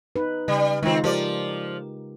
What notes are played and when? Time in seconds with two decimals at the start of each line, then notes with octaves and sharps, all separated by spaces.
0.16 D#4 B4
0.48 C#3 G3
0.83 D#3 G#3 C4 D#4 F4
1.04 F3 G4 A#4 D5